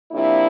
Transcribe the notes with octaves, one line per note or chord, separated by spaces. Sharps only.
C3 F3 A#3 D4 E4